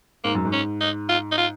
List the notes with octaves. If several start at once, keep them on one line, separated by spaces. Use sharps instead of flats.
G#2 A#3
F#2
G#2
C#4
D#4
F4
D#4
F4